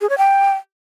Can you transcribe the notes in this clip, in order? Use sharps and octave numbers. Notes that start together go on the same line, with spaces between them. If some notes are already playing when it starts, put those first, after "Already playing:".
G#4
C#5
G5